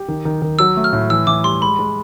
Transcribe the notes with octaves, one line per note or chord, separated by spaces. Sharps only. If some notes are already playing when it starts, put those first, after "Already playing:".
Already playing: G4
D#3
D#3
D#3
F#3 E6
A3
F6
A2
E3 E6
E3 D6
G3 C6
G#3 B5
G#3